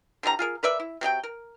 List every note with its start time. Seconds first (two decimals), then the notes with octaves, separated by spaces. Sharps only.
0.23 D3 E3 G3 A#5
0.39 F4 G#4 A#4
0.63 A#4 B4 D5 E5
0.80 E4
1.01 C3 F#3 D#4 G5
1.23 A#4